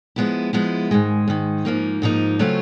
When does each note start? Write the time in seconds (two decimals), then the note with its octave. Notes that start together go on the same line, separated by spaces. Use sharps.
0.16 F3 G#3 B3 E4
0.53 F3 G#3 B3 E4
0.91 G#2 D#3 G#3
1.28 G#2 D#3 G#3
1.65 G#2 F3 A#3 D#4
2.02 G#2 F3 A#3 D#4
2.39 C#3 F#3 A3 C4 F4